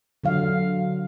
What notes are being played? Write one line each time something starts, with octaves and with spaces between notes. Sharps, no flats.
D3 F#3 F5